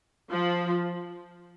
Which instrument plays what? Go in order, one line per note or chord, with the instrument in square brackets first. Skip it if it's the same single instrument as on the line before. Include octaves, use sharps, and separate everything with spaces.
[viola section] F3